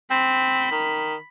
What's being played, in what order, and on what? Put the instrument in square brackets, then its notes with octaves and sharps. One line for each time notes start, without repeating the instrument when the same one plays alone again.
[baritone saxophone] C4 [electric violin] B5
[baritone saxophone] D#3